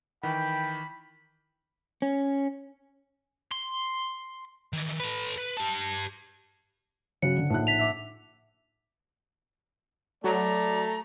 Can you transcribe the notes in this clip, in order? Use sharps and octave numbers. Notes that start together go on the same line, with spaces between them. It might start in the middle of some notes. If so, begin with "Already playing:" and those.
D#3 E3 G5 B5
C#4
C6
D#3 E3
A4 B4
B4
G4 A5
C#3 F#3 F#5 C#7
D3
A#1 A2 D#4 F#6
B6 F7
E5 D6
F#3 A3 D5 A#5